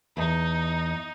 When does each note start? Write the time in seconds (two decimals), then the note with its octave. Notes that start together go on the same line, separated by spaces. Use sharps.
0.17 E2 D#4